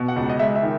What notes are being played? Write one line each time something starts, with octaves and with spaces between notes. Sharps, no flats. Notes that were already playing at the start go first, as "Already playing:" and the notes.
Already playing: B2
F#5
C#2
D#5
G#3 E5
E5
D#3